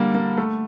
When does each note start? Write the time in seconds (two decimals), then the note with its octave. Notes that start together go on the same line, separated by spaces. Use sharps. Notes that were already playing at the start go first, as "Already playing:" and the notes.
Already playing: D3 G3 A#3
0.14 A#3
0.38 A3